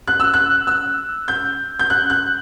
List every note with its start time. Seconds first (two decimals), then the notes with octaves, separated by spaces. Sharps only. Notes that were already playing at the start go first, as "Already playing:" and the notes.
0.08 F#6
0.20 E6
0.34 F#6
0.67 E6
1.28 G6
1.79 G6
1.90 F#6
2.10 F#6